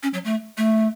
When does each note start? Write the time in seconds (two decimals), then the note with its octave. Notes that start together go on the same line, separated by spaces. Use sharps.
0.03 C#4
0.13 F#3
0.25 A3
0.57 A3